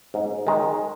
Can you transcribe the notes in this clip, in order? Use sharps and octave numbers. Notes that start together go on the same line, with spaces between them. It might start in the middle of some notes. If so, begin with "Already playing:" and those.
G#2
D#3 G#3